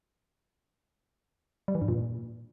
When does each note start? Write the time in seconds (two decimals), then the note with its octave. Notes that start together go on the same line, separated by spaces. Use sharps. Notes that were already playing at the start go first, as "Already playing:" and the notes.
1.68 G3
1.75 E3
1.82 G2
1.88 A#2